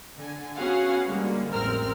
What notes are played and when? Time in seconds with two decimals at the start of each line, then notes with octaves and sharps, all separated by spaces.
0.17 D3 G#5
0.56 B3 C#4 F#4 G#4 F5 F#5
1.08 D3 G3 G#3 A#3
1.52 A1 F2 C4 A#4 F6